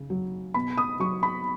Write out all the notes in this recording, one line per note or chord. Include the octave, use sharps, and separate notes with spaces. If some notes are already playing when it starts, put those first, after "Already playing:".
Already playing: C#3
F#3
B2 B5
D#6
F#3 C#6
B5